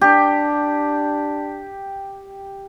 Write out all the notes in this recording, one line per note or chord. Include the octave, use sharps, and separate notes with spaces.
D4 G4